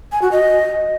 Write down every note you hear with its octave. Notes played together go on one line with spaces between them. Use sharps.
G#5
F#4
D#5